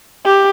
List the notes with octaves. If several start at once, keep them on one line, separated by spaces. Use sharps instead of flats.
G4